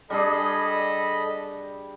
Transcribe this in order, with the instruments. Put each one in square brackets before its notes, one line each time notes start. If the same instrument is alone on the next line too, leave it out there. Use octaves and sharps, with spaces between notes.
[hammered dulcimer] G3 D4 G#4 [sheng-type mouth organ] A4 D#5 B5